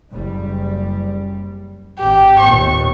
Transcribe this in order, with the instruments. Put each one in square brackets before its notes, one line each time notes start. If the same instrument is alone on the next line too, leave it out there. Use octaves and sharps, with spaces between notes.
[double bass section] F#1 G3
[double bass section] G#1 [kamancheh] G4
[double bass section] D#2 A#2 B3 [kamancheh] C#6